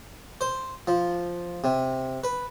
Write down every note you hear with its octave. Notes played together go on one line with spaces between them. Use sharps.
C5
F3
C3
B4